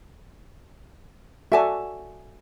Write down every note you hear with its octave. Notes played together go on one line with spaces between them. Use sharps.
F#4 A4 D5 E5 G#5 A5